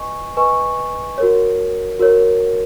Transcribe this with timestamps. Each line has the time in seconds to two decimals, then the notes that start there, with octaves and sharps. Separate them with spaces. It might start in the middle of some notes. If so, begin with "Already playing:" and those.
Already playing: B4 D#5 G#5 C#6
0.37 B4 D#5 G#5 C#6
1.18 F#4 A#4 C#5
1.99 F#4 A#4 C#5